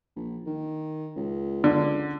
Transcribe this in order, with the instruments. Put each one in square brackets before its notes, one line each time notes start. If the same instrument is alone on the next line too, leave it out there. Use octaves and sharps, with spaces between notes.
[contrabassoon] A#1
D#3
C#2
[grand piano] D3